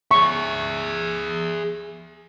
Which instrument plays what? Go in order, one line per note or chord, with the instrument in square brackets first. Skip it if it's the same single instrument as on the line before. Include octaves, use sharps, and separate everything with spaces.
[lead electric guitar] G#4 E5 [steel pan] C#6